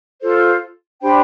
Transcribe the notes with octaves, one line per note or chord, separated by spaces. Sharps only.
F4 A4 C5
D4 G4 C5 G5 B5